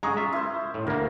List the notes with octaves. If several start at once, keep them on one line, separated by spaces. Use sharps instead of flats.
G#3 A#5 C#6 D#6
F4 E5
E4 C5
A2
D2 A#3 A#4